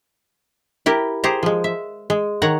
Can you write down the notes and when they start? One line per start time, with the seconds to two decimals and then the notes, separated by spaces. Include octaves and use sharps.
0.86 E4 G4 A#4
1.24 G4 G#4 C5 A#5
1.43 F3 G#3
1.64 E5
2.10 G#3
2.42 D#3 C#5 F#5 A#5